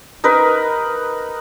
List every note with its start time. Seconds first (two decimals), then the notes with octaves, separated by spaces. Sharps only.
0.24 D#4 A#4 B4